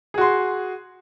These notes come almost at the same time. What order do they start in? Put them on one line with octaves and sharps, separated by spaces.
G#4 F#4 C6